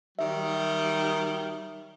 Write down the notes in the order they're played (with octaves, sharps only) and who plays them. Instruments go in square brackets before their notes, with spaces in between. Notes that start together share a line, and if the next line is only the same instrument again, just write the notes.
[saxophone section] D#3 F#3 G3 [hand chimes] E5